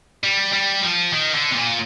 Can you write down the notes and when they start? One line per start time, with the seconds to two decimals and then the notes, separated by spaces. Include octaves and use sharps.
0.24 G3
0.53 G3
0.83 F3
1.13 D#3
1.34 D3
1.51 C3
1.56 A#2